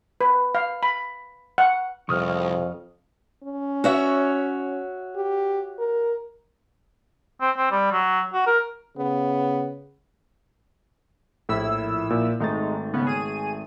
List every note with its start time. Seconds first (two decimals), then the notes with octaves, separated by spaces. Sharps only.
0.21 B4
0.55 F5
0.83 B5
1.58 F#5
2.09 C2 F2 C#6 D#6 F6
3.43 C#4
3.84 F#4 C#5 E5
5.16 G4
5.79 A#4
7.41 C4
7.57 C4
7.71 G3
7.92 F#3
8.33 F#4
8.47 A#4
8.97 C#3 B3
11.49 A#1 A2 E4 E6
12.10 A#2
12.40 G#1 G#3 A3 D#4 A6
12.93 C#3 B3 C#4
13.07 G#4 D#7